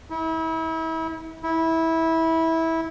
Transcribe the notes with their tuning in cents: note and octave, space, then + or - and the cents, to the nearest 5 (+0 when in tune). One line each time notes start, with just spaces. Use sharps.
E4 -35
E4 -20